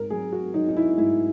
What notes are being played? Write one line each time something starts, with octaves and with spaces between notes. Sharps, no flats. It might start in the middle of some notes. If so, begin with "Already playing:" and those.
Already playing: G#2 A#4
F#3 G#4
F#4
F#3 D#4
D#4
E4
G#2 E4